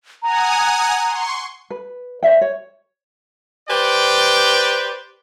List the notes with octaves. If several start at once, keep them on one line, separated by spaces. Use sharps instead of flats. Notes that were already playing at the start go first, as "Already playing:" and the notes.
F#5 G#5 A#5 D#6
C6 C#6
B4
C5 D5 E5 G5
C#5
G4 B4 C5 D5 G5